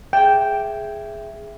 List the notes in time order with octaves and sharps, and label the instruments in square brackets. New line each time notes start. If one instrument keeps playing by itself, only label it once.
[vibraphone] G#4 E5 [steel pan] G5